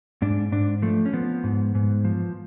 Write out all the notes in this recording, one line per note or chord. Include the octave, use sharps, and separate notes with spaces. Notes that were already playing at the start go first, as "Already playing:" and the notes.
G#2 D4
G#2 D4
F3 A3
C#4
F3 B3
G#2
G#2
F3